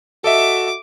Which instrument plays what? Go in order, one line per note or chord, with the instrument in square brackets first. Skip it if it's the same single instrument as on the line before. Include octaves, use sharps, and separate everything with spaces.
[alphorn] F#4 [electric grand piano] A4 D#5 E5 [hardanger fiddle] D6